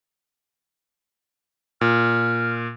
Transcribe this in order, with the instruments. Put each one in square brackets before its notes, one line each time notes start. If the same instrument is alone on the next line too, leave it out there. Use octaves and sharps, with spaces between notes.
[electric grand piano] A#2 [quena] F6